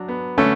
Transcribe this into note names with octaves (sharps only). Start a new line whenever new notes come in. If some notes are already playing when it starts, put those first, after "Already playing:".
Already playing: F#3 D4
B3
D3 A3 C#4